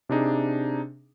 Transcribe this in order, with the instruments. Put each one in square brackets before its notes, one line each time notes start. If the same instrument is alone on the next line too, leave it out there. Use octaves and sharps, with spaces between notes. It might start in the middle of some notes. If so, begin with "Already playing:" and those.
[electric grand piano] C3 D4 D#4 G#4